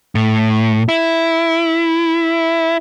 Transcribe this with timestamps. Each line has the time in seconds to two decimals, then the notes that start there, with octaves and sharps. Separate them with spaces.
0.15 A2
0.89 E4